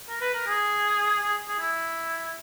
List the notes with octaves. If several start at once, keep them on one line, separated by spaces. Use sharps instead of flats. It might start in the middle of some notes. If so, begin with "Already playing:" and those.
A#4
B4
A#4
G#4
G#4
G#4
E4